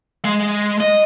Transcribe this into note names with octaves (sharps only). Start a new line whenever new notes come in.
G#3
D#5